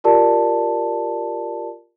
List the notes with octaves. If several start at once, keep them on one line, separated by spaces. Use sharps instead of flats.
F4 G4 A#4 D5 A5